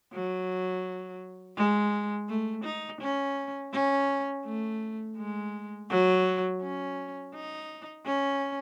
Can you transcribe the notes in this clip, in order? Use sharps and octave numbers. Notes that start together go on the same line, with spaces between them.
F#3
G#3
A3
D#4
C#4
C#4
A3
G#3
F#3
C#4
D#4
C#4